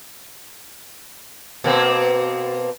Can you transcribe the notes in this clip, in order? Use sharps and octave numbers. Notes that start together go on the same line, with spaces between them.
B2 A#3 C4